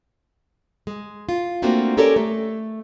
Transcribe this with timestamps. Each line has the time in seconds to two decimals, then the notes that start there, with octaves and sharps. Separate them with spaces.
0.87 G#3
1.29 F4
1.62 A3 A#3 C4 D4 F4 F#4
1.97 C#4 G4 A4 A#4 C#5 D5
2.16 A3